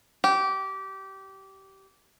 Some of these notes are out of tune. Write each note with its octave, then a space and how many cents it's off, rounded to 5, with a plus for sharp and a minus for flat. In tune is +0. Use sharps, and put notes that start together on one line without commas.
G4 -20